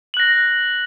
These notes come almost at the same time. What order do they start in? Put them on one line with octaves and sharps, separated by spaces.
F#7 F#6 A#6